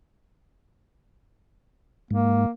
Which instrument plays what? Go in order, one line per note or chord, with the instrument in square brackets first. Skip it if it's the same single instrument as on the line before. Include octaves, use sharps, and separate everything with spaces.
[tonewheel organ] G#2 [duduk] A#3